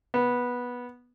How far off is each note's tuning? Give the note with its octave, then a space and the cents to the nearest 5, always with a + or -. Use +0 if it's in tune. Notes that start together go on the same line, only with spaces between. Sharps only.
B3 -10